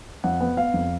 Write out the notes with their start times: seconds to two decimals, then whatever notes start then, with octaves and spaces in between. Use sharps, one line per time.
0.24 F2 F#5
0.41 B3
0.57 B3 F5
0.74 F2